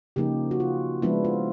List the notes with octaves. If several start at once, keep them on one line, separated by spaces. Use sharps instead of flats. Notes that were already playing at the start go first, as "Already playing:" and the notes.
C#3 F3 A#3 D#4 G4
F#4
F4
F3 G#3 B3 D4 E4
F4